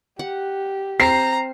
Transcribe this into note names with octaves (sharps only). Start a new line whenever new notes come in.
G4 F#5
C4 C5 A#5 C7